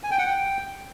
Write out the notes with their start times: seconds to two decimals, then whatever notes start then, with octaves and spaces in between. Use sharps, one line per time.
0.03 G#5
0.11 G5
0.19 F#5
0.26 G5